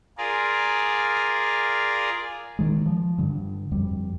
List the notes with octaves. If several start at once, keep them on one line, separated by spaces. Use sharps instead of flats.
F4 G#4 A#4 D5
D#3 G#3
F3
G2 D3
F2 G3